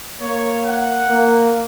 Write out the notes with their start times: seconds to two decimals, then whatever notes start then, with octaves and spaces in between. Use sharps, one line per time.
0.21 A#3 C#5
0.65 F#5
1.09 A#3